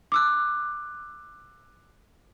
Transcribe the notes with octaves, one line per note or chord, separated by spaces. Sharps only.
D6 E6 F#6